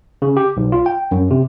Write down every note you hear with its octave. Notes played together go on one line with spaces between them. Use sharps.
C#3
G4
B1
F4
G5
F#2
C3